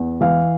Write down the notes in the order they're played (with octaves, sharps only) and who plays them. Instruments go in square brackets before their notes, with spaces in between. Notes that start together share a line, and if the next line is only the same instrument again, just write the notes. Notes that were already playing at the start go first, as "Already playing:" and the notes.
Already playing: [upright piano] E2
E3 F5